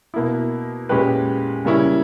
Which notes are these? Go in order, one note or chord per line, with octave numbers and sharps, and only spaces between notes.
B2 A#3 E4
A#2 G#3 C#4 G4 B4
C#3 G3 A#3 C#4 E4